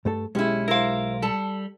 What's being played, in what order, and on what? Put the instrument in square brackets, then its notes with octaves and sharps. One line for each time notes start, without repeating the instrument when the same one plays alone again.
[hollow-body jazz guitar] G2 A3 A4
[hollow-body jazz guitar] B1 G#3 G4 [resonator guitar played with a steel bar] C#4 E4
[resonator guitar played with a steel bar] E4 C5 [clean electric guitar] A#4 F5
[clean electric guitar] G3 [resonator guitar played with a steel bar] A4 A5